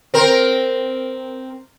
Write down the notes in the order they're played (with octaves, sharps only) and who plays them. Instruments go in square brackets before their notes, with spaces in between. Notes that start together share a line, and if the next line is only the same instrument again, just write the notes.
[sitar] C4 A#4